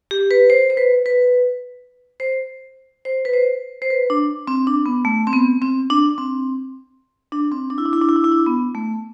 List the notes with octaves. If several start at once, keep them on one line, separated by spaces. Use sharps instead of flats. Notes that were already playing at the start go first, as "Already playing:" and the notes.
G4
B4
C5
C5
B4
B4
C5
C5
B4
C5
C5
B4
D4
C4
D4
B3
A3
C4
B3
C4
D4
C4
D4
C4
D4
E4
D4
E4
D4
E4
D4
E4
D4
B3
A3